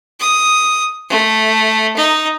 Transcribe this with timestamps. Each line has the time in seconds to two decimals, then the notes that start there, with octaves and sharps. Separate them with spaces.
0.20 D#6
1.09 A3
1.96 D#4